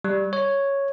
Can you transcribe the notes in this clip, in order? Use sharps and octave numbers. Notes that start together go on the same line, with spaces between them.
G3
C#5